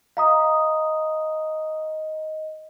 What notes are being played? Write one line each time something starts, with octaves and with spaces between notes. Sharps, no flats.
D#5 F5 A#5 D#6